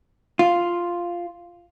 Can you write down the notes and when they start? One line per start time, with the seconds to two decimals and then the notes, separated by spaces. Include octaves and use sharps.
0.39 F4